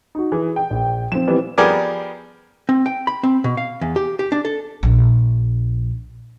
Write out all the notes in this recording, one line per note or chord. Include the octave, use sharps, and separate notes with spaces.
D#4 F#4
E3 G#4
G5
A#1
F3 C4 E7
E3 G3 B3
F3 G3 B3 G#4 A#4 D5
C4
G5
B5
C4
B2
F5
E2
G4
G4
D4
A4
A#1 D4